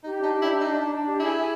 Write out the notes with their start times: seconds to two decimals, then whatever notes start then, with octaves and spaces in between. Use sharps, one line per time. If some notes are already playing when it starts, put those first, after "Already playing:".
0.04 D#4 G4
0.18 D4 D#4
0.33 G4
0.42 E4
0.48 D4
0.61 D4 D#4
0.76 D4
0.91 D4
1.05 G4
1.20 E4 G#4
1.34 G#4